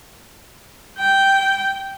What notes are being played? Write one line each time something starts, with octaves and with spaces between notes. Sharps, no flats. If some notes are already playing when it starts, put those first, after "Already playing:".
G5